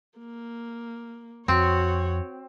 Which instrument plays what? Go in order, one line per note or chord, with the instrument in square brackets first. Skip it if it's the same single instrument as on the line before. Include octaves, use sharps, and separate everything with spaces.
[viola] A#3
[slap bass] F2 [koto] C4 [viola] F#4 C#5